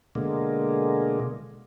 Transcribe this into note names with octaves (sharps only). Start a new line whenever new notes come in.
B2 D3 G#3 A#3